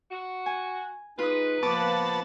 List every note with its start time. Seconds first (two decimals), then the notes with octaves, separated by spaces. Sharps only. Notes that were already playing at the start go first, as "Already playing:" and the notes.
0.11 F#4
0.46 G#5
1.19 G#3 D#4 F4 B4 D#6
1.63 F3 A#3 B3 A5 D6